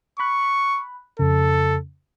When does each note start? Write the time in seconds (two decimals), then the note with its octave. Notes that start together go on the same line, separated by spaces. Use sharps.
0.20 B5 C#6 F#6
1.19 F2 C#3 A4